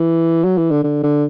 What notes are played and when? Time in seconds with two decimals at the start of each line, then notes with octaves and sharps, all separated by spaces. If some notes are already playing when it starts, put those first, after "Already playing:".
Already playing: E3
0.44 F#3
0.58 E3
0.71 D3
0.84 D3
1.04 D3